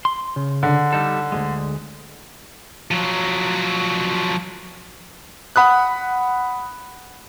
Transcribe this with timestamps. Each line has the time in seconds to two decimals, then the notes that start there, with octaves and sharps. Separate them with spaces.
0.05 C6
0.36 C#3
0.63 D3
0.93 G3 D#4 A4
1.32 D2 G#2 G#3
2.91 F3 F#3
5.56 F#5 B5 D#6 F#6